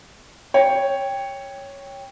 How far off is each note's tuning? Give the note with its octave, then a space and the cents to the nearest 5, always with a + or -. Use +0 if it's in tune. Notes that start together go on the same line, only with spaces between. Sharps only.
C#5 +0 G5 +10